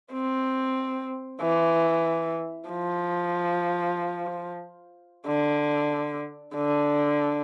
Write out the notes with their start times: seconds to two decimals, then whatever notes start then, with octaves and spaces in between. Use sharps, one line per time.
0.13 C4
1.42 E3
2.70 F3
5.28 D3
6.56 D3